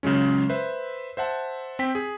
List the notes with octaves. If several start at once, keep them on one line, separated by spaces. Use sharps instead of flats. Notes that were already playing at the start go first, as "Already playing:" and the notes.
C#3 F#3 G#3 C#4
B4 C5 E5
C5 E5 F#5 A5
C4 G5 B6
G#4